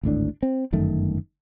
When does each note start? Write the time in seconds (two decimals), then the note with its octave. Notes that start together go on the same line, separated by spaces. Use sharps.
0.03 G#1 D2 A2 D4
0.43 C4
0.73 G1 F#2 D#3 A3